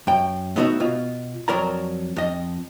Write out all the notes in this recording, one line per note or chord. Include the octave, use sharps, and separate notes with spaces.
F#2 G5
A3 B3 D#4 F#4 D#5 E5
B2 F4
F2 F#3 A#4 D5 A#5
F2 D#5